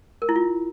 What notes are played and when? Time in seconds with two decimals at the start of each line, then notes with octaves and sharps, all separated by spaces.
0.22 A#4
0.29 E4
0.36 F4